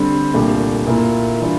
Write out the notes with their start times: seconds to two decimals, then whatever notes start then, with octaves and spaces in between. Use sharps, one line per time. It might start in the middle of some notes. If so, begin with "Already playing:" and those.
Already playing: D3 G3 C4
0.34 C2 A#2 A3 D4 G4
0.87 A#2 A3 E4 A#4
1.39 E3 G3 D4 F4